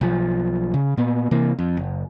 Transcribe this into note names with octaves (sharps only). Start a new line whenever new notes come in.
B1 F3
C#3
A#2 B3
C3 E3 A#3
F2
F#1